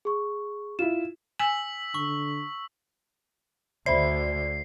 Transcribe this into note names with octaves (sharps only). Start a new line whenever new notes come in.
G#4 C#6
E4 F4 E7
G#5 E6 B6 F#7
D3 C#6
D2 D3 C5 D5 E5 B5 C7